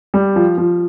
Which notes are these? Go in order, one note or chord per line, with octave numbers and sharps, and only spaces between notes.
G3
F3
F3